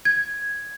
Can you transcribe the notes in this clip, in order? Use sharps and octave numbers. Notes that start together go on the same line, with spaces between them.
G#6